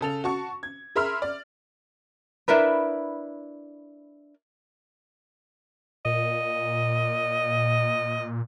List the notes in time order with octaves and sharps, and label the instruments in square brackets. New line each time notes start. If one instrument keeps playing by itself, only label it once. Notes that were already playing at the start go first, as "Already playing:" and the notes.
[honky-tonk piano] C#3 A4 F7
F#4 A5 C#6
G#6
G#4 A#4 E5 B5 C6 F6
D5
[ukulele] D4 E4 A#4 B4
[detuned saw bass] A#2 [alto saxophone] D#5